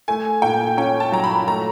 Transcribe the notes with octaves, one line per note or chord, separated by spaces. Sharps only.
A3 G#5
A#2 G5
C#4 G5
A5
F#3 A#5
B5
A3 A#5